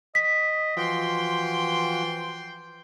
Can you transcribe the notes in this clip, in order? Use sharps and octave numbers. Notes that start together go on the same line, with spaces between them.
D#5 B6
E3 F3 F4 F#4 G5 C6